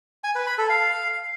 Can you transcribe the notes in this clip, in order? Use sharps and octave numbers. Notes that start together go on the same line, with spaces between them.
G#5
B4
B5
A4
F5